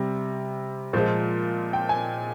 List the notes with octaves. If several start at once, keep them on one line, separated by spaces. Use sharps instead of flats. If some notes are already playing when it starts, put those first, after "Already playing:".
Already playing: C3 G3
A#2 F3 G#3 C5
G5
G#5